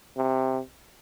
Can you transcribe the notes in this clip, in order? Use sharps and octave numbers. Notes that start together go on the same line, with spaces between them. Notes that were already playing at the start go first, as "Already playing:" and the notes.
C3